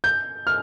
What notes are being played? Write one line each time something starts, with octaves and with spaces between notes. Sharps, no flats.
G6
F6